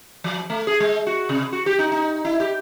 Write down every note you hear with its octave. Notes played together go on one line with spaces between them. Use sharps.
F3
A3
G#4
G#3
F#4
C3
F#4
G4
D#4
D#4
E4
G4